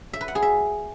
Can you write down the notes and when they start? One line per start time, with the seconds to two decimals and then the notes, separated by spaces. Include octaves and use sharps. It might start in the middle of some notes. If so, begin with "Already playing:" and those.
0.13 E5
0.21 B4
0.28 F#5
0.35 G#4
0.42 E5